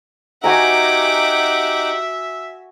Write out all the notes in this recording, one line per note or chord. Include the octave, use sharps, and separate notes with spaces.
D#4 F#4 G4 E5 F#5 G#5 A#5 D6